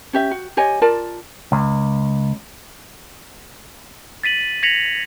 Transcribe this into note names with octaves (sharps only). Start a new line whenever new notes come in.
C#4 G4 E5
F#4
G4 C#5 D#5 G#5
F4 A#4 D5 A5
C#2
A6 B6 D#7 F#7
G#6 A#6 B6 C#7 F7 F#7